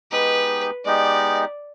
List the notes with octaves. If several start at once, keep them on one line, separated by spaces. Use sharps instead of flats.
G#3 B3 D#4 G4 B4
G#3 B3 D#4 G4 D5